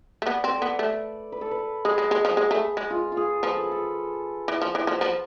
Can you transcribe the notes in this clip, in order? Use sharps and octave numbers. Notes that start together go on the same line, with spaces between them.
A3
B3 D5
C4 D5
A4
B3 B4
A3
B4
A4
B4
G#3 G#4
G#3
G#3
F3
G#3
A3
G#3
F4
F4
G#4
F3 B4
A4
G#4
A4
E3
F3
E3
F3 C5
F3 B4